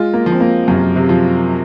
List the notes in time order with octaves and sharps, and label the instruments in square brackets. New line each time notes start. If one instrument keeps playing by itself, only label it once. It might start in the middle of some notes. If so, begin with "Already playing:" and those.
Already playing: [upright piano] G#3 [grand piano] F4
[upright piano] A#3
[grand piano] F3
[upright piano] C4
A#3
[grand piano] F#2 [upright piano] C3
[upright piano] C3
[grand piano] F3